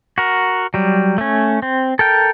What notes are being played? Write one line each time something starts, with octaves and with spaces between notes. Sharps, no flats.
F#4 A#4
F#3 G3
A3 C#4
C4
A4 A#4 G5